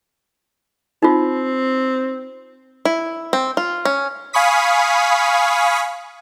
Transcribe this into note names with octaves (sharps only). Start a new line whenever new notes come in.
C4 D#4 F4
E4
C4
F4
C#4
F5 G#5 B5 C#6 D#6 B6